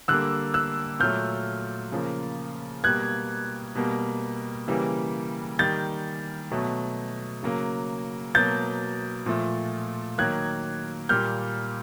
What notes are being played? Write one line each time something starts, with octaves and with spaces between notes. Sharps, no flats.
D3 G3 A#3 E6 F#6
E6 F#6
A#2 F#3 A3 F6 G6
C#3 F3 A#3
B2 G3 A#3 F#6 G#6
B2 G3 A#3
C#3 E3 G3 A#3
D#3 G3 A#3 G6 A6
B2 F#3 A3
C#3 F#3 A#3
B2 F#3 A#3 G6 A6
A#2 F3 A3
D#3 F#3 A#3 F#6 G#6
A#2 G3 A#3 F6 G6